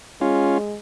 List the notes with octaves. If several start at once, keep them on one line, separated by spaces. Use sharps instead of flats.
G#3 C#4 F4